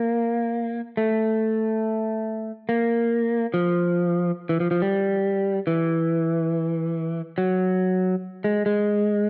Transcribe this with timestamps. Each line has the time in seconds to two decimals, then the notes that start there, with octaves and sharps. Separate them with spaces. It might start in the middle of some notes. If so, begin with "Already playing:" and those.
Already playing: A#3
0.97 A3
2.69 A#3
3.54 F3
4.49 E3
4.60 F3
4.71 F3
4.82 G3
5.67 E3
7.38 F#3
8.44 G#3
8.66 G#3